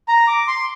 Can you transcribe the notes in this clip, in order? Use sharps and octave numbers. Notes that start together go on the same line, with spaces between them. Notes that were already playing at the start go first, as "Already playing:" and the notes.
A#5
D6
C6